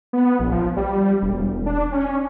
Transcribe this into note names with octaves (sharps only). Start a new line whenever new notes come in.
B3
A#1
F3
G3
E1
D4
C#4